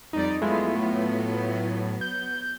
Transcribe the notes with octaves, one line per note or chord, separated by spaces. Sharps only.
F2 G3 D#4 D5
F#3 G#3 A3 B3 E4 F4
A2
G6